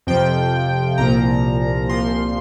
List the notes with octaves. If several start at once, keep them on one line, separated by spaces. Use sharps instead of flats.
F2 C3 F3 G5
C2 A#2 F3 A#5
C2 A#2 F3 C6